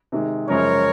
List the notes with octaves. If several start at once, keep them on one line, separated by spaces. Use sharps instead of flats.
C3 D#3 G#3
F#2 C#3 F3 G#3 A#4 C#5